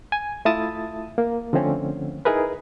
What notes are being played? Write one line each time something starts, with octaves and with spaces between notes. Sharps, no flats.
G#5
A3 E4 F4 A5 D#6 A6
A#3
D3 F3 A3 C4 C#4
D#4 E4 G#4 A#4 B4